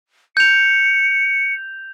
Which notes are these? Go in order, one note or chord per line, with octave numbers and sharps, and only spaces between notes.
G6 C#7 F7